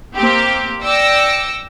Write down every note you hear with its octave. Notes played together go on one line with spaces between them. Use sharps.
A#3 C4 G4
D5 G5 E6 A#6 C#7